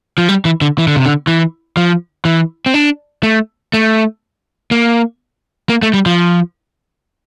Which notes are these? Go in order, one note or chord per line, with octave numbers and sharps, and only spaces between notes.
F3
G3
E3
D3
E3
D3
C3
D3
E3
F3
E3
C4
D4
A3
A3
A#3
A#3
A3
G3
F3